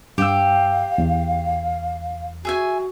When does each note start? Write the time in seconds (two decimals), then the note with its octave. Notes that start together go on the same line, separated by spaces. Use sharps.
0.18 G2 G4 F5 G5 E6
0.98 E2
2.45 F#4 G#4 E5 G#5